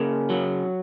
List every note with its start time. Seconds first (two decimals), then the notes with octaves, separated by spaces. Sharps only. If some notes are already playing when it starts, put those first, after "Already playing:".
Already playing: C#3 A#3
0.30 F#3